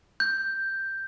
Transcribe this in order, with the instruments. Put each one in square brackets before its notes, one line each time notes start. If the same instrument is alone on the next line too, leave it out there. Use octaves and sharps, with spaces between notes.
[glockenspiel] G6